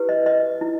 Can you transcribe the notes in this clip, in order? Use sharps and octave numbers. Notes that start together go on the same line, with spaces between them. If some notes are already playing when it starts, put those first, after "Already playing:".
Already playing: E4 G4 B4
D#5
D#5
E4